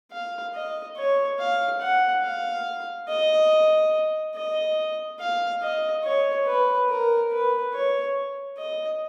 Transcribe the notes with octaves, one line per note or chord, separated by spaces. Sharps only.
F5
D#5
C#5
F5
F#5
F5
D#5
D#5
F5
D#5
C#5
B4
A#4
B4
C#5
D#5